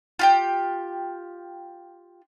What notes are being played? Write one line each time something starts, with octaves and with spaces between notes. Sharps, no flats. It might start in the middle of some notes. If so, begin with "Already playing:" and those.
F4 G4 G5